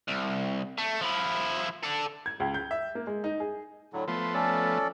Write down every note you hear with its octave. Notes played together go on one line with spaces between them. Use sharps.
C2
A3
F3 E4
A4 D5
G#6
C#2
G6
E5
A#3
G#3
D#4
G#4
A2 D3 F#3
F3 A3 B3 C6
C#4 A4 D5